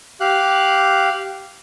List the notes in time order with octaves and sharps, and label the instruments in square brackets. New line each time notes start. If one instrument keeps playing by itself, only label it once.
[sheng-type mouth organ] G4 F5 F#6